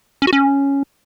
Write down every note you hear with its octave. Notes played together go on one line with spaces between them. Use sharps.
C#4
F#4
C#4